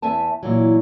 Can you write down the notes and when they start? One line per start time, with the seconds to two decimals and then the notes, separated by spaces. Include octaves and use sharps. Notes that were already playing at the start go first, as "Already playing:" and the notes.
0.02 E2 E5 G#5 A5
0.43 A#2 E3 F#3